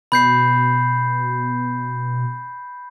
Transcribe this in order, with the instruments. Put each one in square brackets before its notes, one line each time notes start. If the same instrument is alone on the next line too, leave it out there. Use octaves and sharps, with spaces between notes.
[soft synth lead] B2 [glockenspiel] B5 G6 C7